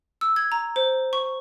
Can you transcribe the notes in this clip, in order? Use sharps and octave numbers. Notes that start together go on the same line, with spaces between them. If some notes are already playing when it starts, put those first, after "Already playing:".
E6
G#6
A#5
C5
C#6